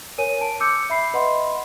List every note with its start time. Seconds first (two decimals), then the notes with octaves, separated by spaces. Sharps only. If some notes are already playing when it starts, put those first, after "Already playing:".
0.18 A#4 C#5 G#5 D#7
0.41 A5 D7
0.60 D6 E6 G6 C#7
0.90 E5 B5 C7
1.14 B4 D#5 E5 F#5 B5 C6